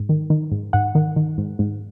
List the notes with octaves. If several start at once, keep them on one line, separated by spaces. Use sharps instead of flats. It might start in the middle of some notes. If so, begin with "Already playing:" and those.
Already playing: G#2
D#3
D#3
G#2
G#2 F#5
D#3
D#3
G#2
G#2